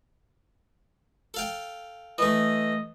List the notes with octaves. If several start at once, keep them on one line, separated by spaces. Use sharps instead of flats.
A4 F5 G5
E3 A3 D#5